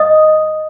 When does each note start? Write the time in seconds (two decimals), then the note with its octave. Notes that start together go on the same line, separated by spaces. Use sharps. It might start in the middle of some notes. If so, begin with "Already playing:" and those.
Already playing: D#5 D#6